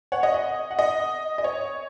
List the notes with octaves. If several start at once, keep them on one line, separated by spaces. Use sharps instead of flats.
C#5 F#5
D#5
D#5
F#5
D#5
D#5
C#5